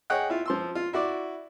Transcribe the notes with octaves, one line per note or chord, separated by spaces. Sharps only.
G#4 C#5 D#5 F#5 G5 F#6
E4 F4
F3 C6 E6
F4
E4 F#4 D5